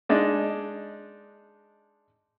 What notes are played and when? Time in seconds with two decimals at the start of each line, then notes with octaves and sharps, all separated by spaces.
0.09 G#3 D4 D#4